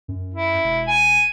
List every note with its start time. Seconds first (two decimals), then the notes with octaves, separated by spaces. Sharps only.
0.08 F#2
0.34 E4
0.64 E1
0.87 G#5